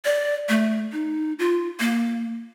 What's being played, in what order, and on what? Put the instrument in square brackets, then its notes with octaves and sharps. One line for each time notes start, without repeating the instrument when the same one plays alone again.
[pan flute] D5
A3
D#4
F4
A#3